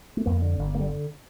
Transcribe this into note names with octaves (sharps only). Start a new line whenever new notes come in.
A3
F2 A#3
D3
G1
D3 A#3
G3